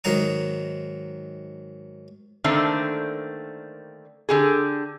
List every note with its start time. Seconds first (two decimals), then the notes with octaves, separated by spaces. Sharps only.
0.04 G#2 D#3 F#3 F#5 A#5 D#6
2.44 D3 D#3 A3 A#3 C4 D4
4.29 D3 G4 G#4